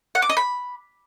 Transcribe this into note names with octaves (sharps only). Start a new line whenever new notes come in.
F#5
D6
D#5
B5